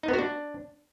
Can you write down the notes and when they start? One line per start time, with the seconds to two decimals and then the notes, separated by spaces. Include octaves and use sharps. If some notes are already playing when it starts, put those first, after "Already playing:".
0.03 D#4
0.08 B3
0.13 F#4
0.19 D4